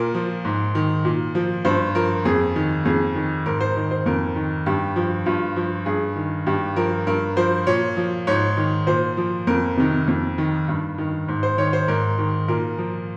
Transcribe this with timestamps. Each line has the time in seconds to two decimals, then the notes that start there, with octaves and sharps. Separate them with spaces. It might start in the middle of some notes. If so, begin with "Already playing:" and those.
Already playing: A#2 A#4
0.15 F3
0.45 G#2
0.75 D#3
1.05 A#2
1.35 F3
1.65 G2 C5
1.95 F3 A#4
2.25 F2 G#4
2.56 D#3
2.85 F2 G#4
3.15 D#3
3.46 G#2 A#4
3.61 C5
3.76 D#3
3.91 C5
4.06 F2 A#4
4.36 D#3
4.66 G2 G4
4.96 F3
5.26 G2 F4
5.56 F3
5.86 G2 G#4
6.16 D#3
6.47 G2 G4
6.76 F3 A#4
7.07 G2 A#4
7.37 F3 C5
7.67 A#2 C#5
7.97 F3
8.27 G#2 C#5
8.57 D#3
8.87 A#2 C5
9.17 F3
9.47 F2 A#4
9.77 C3 D#3
10.08 F2
10.38 D#3
10.68 G2
10.98 D#3
11.28 G#2
11.43 C5
11.58 D#3 C#5
11.73 C5
11.88 G#2 A#4
12.18 D#3
12.48 A#2 A#4
12.78 F3